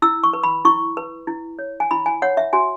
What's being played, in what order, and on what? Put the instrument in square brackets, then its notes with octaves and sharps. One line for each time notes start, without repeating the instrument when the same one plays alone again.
[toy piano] E4 E6
C#6
B4
B5
E4 C#6
B4
E4
C#5
G#5
E4 B5
G#5
C#5 F#5
E5
F#4 G#5